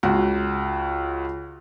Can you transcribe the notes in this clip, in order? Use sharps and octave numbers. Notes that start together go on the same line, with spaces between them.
C#2 F#4